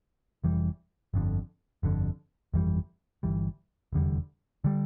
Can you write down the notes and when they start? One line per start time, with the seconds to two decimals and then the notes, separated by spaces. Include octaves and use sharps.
0.44 F1 F2 E3 G3
1.14 G1 F2 D3
1.83 G1 F2 D3
2.54 G1 F2 E3 G3
3.23 G1 F2 E3 G3
3.93 F1 E2 D3 G3
4.64 D3 G3